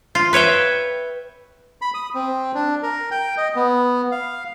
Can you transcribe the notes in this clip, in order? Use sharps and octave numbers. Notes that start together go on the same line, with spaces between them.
F4
B4 C#5 E5 G5
B5
D#6
C4
D4
A#4
G5
D#5
B3
F5